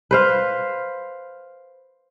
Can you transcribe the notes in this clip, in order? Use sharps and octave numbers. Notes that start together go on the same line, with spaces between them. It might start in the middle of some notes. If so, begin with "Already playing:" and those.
B4 C5 F5